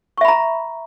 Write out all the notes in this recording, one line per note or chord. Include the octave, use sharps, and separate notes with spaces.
E5 A#5 B5 C#6